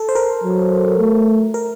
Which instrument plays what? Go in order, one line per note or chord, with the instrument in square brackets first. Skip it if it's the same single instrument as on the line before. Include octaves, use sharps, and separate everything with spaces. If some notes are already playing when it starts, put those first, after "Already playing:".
Already playing: [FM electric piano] A4
C5
A#4
[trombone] F#3
A3
[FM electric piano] A#4